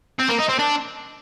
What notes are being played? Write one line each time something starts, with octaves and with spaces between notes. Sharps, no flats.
C4
A#3
D#4
C4
D4